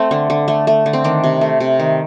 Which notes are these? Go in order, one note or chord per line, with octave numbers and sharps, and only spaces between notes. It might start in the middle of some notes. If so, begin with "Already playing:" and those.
Already playing: A3 C4
D3
D3
A3
A3
D3
C4
D#3 D4
C3
A3
C3
D#3